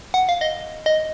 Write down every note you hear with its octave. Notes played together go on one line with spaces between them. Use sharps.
F#5
F5
D#5
D#5